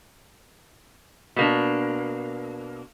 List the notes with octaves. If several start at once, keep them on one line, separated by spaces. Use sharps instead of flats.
B2 A#3 D4